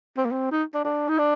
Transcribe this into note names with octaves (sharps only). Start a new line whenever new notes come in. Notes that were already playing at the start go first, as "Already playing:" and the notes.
C4
A#3
C4
D#4
D4
D4
D#4
D4